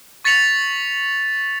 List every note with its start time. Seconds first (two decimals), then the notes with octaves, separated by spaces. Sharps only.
0.25 C#6 A6 B6 C#7 F7 F#7